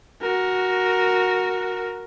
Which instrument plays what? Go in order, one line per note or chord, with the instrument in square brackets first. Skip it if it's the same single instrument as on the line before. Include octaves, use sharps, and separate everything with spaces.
[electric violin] F#4 A#4